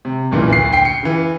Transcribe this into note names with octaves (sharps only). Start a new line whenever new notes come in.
C3
B1 A#2 C#3 E3
D2 C7
G5 C7
C#7
C#3 E3